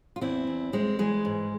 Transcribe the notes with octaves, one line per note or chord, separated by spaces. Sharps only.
F4
E2 C4 E4
E2
E2 G#3 C4
E3 G#3
G#2